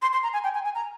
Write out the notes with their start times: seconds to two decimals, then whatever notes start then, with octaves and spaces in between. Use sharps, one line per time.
0.02 C6
0.13 C6
0.23 A#5
0.33 G#5
0.44 G5
0.54 G#5
0.64 G#5
0.75 A#5